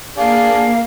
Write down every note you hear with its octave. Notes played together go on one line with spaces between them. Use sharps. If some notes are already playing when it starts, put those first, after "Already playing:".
A#3 D4 G#4 F5 A5